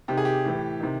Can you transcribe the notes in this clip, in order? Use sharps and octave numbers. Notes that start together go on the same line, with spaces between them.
C3 D#3 G4
G#4
G4
A2 E3
C3 D#3